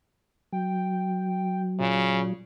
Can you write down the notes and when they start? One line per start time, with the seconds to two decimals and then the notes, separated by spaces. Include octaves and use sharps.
0.53 F#3 G5
1.79 A#2 C#3